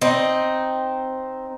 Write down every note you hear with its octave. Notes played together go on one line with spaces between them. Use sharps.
C4 D#4